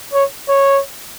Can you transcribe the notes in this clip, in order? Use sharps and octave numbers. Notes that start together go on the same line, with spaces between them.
C#5
C#5